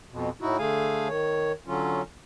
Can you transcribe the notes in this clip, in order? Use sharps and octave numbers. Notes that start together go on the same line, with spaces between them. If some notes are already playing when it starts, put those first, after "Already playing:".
F2 B2
A2 D#4 E4 F#4
D3 A3 G#4 F5 G#5
D#3 C#5
D3 F#3 C#4 F4